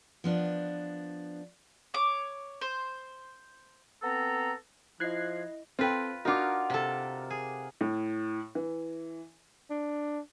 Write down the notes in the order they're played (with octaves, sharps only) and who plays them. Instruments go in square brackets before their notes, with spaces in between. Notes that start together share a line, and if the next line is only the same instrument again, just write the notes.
[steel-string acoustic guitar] F3 B3 D4
[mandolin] C#5 D6
C5
[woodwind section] B3 C4 A4 A#5
[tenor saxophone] F3 [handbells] E4 D#5 [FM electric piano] F#6 G#6 C7
[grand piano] C4 A4 G5 [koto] F4 B4
[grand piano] D4 F#4 [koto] D#4 F4 [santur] A#4 F#5 D6
[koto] C3 A4
G#4
[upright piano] A2
E3
[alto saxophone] D4